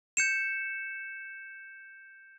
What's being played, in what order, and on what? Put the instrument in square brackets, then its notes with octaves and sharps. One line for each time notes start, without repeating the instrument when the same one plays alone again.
[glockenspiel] G6 C#7 E7